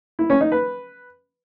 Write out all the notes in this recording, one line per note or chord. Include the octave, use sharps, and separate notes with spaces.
E4
C#4
D#4
B4